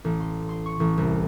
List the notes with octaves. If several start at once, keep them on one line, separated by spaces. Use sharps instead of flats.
A1
C6
C6
C#6
A1
C2